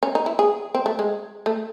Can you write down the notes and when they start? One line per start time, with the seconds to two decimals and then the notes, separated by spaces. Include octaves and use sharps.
0.03 C#4
0.15 D#4
0.26 E4
0.39 G#4
0.75 C4
0.86 A3
0.99 G#3
1.46 A3